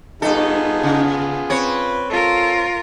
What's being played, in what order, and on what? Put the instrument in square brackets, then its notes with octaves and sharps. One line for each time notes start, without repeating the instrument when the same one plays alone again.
[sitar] G2 A4 [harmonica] B3 F4 G#4 [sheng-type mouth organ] D#4
[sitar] C#3
[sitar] C4 C#5 [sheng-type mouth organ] B4
[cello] F4 A#4 [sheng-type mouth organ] A4